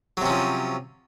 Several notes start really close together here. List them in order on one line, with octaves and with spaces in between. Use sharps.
F#3 C3 C#4 F3